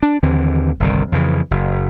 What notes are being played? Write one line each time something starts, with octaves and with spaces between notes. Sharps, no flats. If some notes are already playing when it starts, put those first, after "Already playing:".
D4
D#2 D3 E3 C4
G1 C2 D#3
F2 C#3 E3
F#1